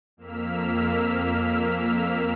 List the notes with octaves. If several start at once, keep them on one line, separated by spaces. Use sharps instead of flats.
F2 A#3 E6 F6 B6